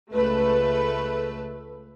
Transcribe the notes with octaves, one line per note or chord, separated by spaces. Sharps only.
C#2 A3 B4